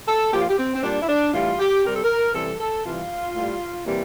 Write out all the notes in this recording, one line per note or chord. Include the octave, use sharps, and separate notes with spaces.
A4
A#2 F3 G4
F4
G4
C4
C4
A#2 G3 D4
E4
D4
A2 E3 G3 F4
G4
C3 G3 A#4
A4
A#4
C3 E3 G3 A4
A4
C3 E3 G3 F4
A2 G3
C3 E3 G3 A#3